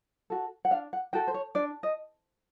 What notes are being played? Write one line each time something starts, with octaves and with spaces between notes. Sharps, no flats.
F#4 A4
F#5
D4 F5
F#5
F#4 A4 G5
C5
C#5
D4 D5
D#5